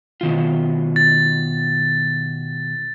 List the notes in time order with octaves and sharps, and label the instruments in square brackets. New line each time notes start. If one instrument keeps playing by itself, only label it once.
[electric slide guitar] B2 D#3 F4
[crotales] A6